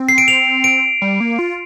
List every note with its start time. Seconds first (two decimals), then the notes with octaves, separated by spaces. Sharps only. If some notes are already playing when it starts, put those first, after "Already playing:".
Already playing: C4
0.09 C7
0.18 D7
0.28 F7
0.64 D7
1.02 G3
1.20 A#3
1.39 F4